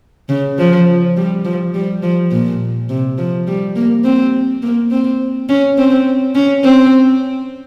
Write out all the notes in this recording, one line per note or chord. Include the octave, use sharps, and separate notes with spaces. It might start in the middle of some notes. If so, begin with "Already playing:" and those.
C#3
F3
G3
F3
G3
F3
A#2
C3
F3
G3
A#3
C4
A#3
C4
C#4
C4
C#4
C4